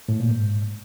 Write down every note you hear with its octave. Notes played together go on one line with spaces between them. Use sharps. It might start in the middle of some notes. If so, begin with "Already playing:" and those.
A2
A#2
G#2